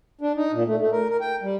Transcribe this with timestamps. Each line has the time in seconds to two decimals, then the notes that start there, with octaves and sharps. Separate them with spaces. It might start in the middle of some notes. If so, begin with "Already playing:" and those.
0.21 D4
0.36 D#4
0.52 A#2
0.66 A3
0.80 A3
0.92 A#4
1.09 A#4
1.21 G5
1.42 G3